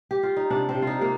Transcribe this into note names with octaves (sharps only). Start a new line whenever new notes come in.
G4
F4
D#4
C3 D4
C4
C3
F4
D#4
C3 A#3